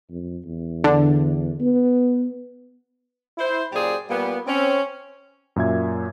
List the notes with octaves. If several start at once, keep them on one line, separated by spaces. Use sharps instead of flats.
F2
E2
D3
B3
E4 C5
F#2 A#2 G4 G#4 C5 D5
A#2 G3 A#3 B3
C4 C#4
F#2 A#2 E5 G#6